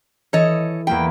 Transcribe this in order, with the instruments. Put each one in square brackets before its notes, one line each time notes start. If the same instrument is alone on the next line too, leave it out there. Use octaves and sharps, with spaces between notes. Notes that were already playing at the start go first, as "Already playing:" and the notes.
[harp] E3 [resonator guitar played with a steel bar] A4 C#5 D#5
[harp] E2 A#3 B5 [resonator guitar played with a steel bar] G5